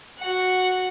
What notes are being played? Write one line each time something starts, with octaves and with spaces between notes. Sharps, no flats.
F#4 F#5